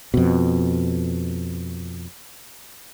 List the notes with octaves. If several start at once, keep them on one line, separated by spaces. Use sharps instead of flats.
F2 B2